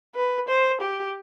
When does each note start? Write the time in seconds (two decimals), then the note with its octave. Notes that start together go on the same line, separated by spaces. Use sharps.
0.15 B4
0.48 C5
0.81 G4